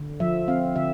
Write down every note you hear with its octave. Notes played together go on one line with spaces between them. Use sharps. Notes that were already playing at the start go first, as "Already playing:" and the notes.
Already playing: D3
F3 E5
C4 F5
D3 E5